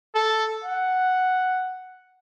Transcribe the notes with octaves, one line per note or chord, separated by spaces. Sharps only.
A4
F#5